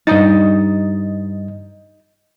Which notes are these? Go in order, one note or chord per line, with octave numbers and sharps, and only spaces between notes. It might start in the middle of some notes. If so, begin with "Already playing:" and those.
G2 D#4 D#5 A5 A6